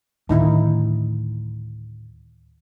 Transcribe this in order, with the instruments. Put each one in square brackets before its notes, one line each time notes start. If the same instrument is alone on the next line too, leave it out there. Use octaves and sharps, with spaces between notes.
[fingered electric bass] D2 A2 [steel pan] D#3 D#4 E4